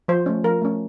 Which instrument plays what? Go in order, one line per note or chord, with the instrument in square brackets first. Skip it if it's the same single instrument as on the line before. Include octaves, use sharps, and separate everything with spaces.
[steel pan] F3 C5
A3 C#4
F3 A#4
A3 C#4